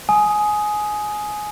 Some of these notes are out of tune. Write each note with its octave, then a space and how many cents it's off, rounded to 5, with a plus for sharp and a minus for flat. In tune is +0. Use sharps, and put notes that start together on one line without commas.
G#5 +15 D#6 +5